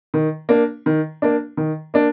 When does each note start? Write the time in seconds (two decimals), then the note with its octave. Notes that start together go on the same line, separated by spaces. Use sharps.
0.14 D#3
0.49 A#3 D4
0.86 D#3
1.22 A#3 D4
1.57 D#3
1.94 A#3 D4